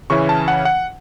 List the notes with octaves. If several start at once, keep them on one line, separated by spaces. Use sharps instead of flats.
C#3 E3 C#4 E4 C#6
A5
F#5
F#5